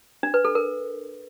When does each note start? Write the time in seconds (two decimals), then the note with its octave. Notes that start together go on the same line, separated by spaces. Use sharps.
0.23 D4
0.34 B4
0.45 A4
0.55 A#4